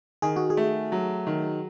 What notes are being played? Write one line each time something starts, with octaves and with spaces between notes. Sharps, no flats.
D#3 G#4
F#4
G#4
A3
F#3
D#3